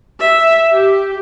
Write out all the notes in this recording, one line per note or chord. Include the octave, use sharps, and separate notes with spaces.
E5
G4